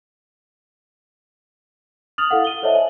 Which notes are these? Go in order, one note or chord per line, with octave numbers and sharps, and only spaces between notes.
D#6 F6 A6 F7 F#7
E4 A4 F5 F#5
D#7 G7
A4 C5 C#5 D#5 E5 A5
G#5 F#7